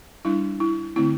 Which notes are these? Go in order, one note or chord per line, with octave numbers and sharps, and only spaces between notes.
G3 D4 E4
E4
D3 A3 C4 E4